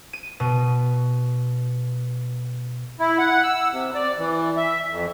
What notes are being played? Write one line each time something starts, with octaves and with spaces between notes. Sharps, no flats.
D#7
B2
E4
F#5
E6
C3
D5
E3
E5
F2